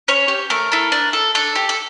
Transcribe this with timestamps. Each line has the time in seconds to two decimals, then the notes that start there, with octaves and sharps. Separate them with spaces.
0.08 C#4 C#5
0.28 G4
0.50 A3 A#4
0.72 E4 A4
0.92 D4
1.13 A4
1.35 D4 A4
1.55 G4
1.69 A4